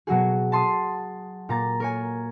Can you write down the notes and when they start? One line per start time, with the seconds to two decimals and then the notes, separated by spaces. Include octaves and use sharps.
0.07 B2 F#3 F#4 G#4
0.52 A5 C6 D#6
1.49 A#2 A#5 A6
1.80 A#4 C#5 G#5